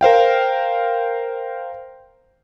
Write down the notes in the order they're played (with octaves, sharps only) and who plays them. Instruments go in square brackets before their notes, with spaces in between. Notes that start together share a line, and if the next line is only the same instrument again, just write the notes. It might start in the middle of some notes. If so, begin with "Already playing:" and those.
[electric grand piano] A#4 C5 F5 G5